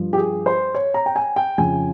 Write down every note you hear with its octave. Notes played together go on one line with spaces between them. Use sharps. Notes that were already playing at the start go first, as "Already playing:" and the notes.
Already playing: G2 F3
G4
G#4
C5
C#5
A#5
G5
G#5
G5
F2 C#3 F3 G#5